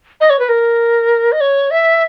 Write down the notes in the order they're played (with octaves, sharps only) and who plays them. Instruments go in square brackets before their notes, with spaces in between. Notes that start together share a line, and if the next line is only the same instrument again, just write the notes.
[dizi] D#5
C#5
B4
A#4
D#5
C#5
E5